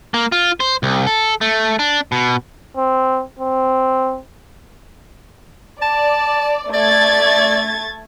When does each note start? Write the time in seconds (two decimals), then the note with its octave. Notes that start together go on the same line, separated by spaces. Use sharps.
0.14 A#3
0.32 F4
0.60 C5
0.83 C2
1.07 A4
1.41 A3
1.79 D4
2.12 B2
2.77 C4
3.39 C4
5.82 D5 A5
6.74 A3 D5 G#6 A6